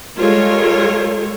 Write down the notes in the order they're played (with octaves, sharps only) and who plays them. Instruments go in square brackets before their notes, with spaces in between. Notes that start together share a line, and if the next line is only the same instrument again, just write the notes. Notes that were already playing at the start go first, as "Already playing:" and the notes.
[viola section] G3 G#3 F4 A4 A#4 C#5